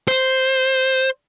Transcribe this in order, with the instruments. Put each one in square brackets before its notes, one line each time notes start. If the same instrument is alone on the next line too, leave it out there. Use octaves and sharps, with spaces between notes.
[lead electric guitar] C5